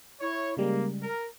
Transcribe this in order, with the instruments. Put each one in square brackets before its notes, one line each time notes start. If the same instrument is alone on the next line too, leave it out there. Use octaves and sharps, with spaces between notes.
[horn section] E4 C#5
[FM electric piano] C#3 G3 G#3 [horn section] A#3
[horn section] A#4